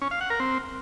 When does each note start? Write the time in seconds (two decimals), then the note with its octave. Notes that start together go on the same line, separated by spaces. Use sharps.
0.02 C#4
0.11 F5
0.21 F#5
0.30 A#4
0.40 C4